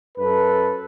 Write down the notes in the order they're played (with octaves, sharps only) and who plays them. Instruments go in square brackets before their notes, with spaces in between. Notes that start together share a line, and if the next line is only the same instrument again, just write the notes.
[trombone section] F#2 A4 B4